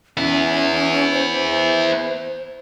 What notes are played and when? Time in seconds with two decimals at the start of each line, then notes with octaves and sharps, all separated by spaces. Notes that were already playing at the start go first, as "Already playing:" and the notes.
0.17 B3 C#4 E4
1.12 C5